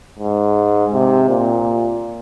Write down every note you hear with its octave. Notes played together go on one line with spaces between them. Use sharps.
G#2
C3
A#2